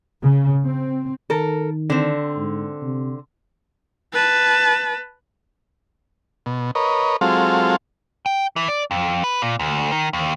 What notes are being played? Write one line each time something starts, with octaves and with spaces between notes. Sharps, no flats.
C#3
C4
D#3 A4 A#4
D3 C4
G#2
C3
B4 A5
B2
A#4 B4 C#5 D#5
F#3 G#3 C4 F4 A4 F5
G5
E3
D5
F2
B4
A#2
D2
D#3
D#2